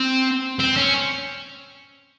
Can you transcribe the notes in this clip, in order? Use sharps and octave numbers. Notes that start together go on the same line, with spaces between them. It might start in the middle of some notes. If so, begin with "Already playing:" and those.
Already playing: C4
C4
C#4